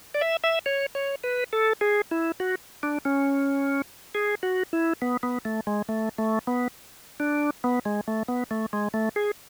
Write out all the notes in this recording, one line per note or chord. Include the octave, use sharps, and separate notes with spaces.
D5
E5
E5
C#5
C#5
B4
A4
G#4
E4
F#4
D4
C#4
G#4
F#4
E4
B3
B3
A3
G#3
A3
A3
B3
D4
B3
G#3
A3
B3
A3
G#3
A3
G#4